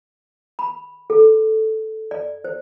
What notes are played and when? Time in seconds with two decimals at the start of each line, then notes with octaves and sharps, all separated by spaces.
0.59 B5
1.10 A4
2.11 D5
2.44 C5